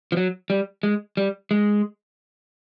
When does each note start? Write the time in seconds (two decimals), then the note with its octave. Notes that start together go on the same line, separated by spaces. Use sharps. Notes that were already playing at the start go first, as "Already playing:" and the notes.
0.12 F3
0.17 F#3
0.50 G3
0.83 G#3
1.17 G3
1.51 G#3